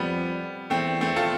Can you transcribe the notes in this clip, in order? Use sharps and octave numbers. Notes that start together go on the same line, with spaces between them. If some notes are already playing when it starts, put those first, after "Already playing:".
Already playing: F2 G3 B3
E2 A3 C4
A3 C4
F4 A4